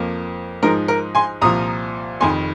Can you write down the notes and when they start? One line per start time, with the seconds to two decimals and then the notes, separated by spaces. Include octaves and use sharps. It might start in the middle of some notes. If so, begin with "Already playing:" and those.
Already playing: F2 F3 A#3
0.62 G#2 F3 G#3 D#4 A#4
0.88 A#4
1.15 G#5 C6
1.41 C2 A#2 F3 A#5 D#6
2.20 F1 F2 D#3 G#5 C6